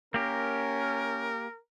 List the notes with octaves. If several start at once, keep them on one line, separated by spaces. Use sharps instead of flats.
A#3 C#4 G4 A#4